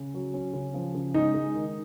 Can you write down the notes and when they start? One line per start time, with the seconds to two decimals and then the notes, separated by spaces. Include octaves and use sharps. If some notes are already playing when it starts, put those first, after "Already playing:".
Already playing: C#3
0.14 F#3
0.34 C#4
0.53 C#3
0.74 F3
0.95 C#3
1.14 G#3 D#4
1.34 G#3
1.54 D#3